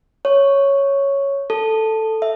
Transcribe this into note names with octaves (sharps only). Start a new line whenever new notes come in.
C#5
A4
E5